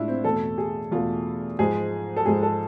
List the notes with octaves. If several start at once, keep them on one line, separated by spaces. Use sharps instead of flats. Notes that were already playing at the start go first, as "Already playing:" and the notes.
Already playing: A2 G#3 D4 E4 F4
C4
E2 B2 A3 A4
G#4
E2 B2 A3 F4
G#2 F3 G#3 G#4
A4
G#2 F3 G#3 G#4
A4